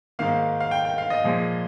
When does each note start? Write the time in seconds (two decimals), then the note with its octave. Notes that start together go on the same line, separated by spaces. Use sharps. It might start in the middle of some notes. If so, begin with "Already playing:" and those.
0.19 G#2 D#3 A#3 F5
0.60 F5
0.71 G5
0.85 G5
0.98 F5
1.10 D#5
1.24 A#2 F3 G#3